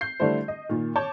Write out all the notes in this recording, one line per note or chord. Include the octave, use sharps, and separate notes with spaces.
G6 C7
D3 G3 A3 D4 E4 C5
D#5
A#2 D#3
C#5 A5 D6 G6